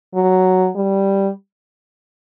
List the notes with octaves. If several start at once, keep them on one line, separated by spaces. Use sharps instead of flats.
F#3
G3